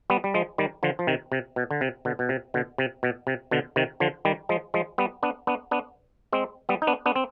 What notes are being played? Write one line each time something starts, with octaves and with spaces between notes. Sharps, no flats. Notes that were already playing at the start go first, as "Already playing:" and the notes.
G3 B3
G3
F3 G#3
D#3 G3
D3 F3
F3
C3 D#3
C3
B2
D3
C3
B2 D3
B2
C3
B2 D3
C3
B2
C3
B2 D3
C3 D#3
D3 F3
D#3 G3
F3 G#3
F3 G#3
G3 B3
B3 D4
B3 D4
B3 D4
G#3 C4
G3 B3
D#4
B3 D4
B3 D4
C4